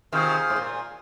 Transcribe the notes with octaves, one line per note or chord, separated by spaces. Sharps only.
C3 D#3 F4 G#4 C5 F5
G#2
A#2